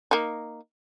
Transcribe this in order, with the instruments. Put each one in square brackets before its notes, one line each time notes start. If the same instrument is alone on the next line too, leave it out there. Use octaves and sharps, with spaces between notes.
[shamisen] A#3 D#4